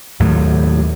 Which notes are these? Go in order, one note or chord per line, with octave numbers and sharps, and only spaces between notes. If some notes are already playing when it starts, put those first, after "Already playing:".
D#2 A2 F#3